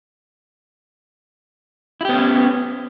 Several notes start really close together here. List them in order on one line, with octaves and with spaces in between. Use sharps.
E4 G4 B3 C#4